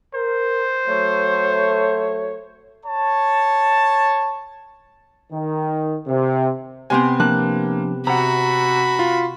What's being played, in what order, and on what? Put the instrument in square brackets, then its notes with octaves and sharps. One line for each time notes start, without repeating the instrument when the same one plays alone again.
[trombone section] A#4 [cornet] C5
[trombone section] F#3 A3 [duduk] C#5
[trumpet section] C#5 A5
[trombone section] D#3
C3
[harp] C3 B3 C4 [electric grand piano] G#5 C6
[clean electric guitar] F3 D4 A5 [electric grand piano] A#3 [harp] F#6
[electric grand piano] C3 F#5 [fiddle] F#4 B5 [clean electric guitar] A#5
[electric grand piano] F4